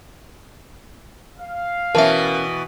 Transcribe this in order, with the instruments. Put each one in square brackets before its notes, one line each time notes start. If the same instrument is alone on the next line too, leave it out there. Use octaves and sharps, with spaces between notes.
[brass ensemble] F5
[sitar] B2 E3 [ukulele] C#4 A5 [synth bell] A#4 E5